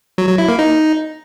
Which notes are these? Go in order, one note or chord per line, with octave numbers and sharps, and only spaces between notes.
F#3
F#3
E4
A#3
D#4